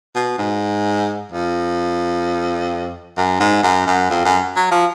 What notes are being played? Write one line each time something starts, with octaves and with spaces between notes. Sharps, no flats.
B2
G#2
F2
F#2
G#2
F#2
F#2
F2
F#2
F#3
F3